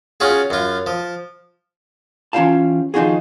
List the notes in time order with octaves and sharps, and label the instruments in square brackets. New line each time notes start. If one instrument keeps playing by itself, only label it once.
[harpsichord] C#4 F4 F#4 G#4
F#2 F4
F3
[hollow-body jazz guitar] E3 C#4 F4 G4 F5 A5
D#2 F3 D#4 F4 F#4 G#4